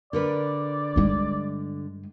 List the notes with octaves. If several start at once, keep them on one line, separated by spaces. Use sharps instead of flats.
D3 A#4 B4 D5
G2 G#3